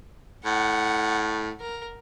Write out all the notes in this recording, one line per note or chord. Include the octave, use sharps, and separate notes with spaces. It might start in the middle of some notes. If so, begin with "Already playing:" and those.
A2 F#5
A#4